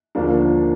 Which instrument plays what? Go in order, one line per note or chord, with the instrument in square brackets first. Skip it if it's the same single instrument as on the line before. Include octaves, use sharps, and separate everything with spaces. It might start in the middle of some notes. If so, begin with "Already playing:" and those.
[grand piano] D#2 D3 F3 A#3 D4